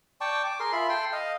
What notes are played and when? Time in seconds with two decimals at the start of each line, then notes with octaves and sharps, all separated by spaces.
0.21 D5 G5 A5 C#6
0.44 D6
0.60 G#4 A#4 C6
0.73 F4 E5 B5
0.89 A4 G5 C6
1.13 D#5 F5